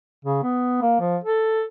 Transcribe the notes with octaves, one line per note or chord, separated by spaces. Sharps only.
C#3
B3
A#3
F3
A4